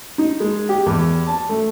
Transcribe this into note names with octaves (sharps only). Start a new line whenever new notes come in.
D#4
G#3
G4
E2
A5
A3